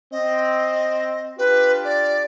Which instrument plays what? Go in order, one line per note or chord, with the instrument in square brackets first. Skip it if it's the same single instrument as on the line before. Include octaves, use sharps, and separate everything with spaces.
[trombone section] C4 [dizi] D#5
[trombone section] D4 F4 G4 [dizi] B4
[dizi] D5